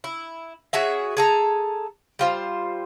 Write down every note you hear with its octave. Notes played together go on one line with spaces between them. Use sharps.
E4
C#4 F#4 G#4 E5
G#4 A4 A#5
G3 F4 C5